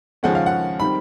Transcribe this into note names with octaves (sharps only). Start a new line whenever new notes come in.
D#2 C#3 F3 G#3 C#4 F#5
F5
F#5
D#3 G3 C4 B5